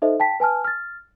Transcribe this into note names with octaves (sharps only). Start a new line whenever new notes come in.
D#4 A4 C5 D#5 E5
G5 A5 B6
B4 G#5 A5 F6
F6 A6